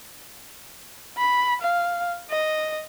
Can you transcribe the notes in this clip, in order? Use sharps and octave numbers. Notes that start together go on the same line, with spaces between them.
B5
F5
D#5